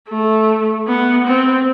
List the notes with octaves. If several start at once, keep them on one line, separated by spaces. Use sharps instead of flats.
A3
B3
C4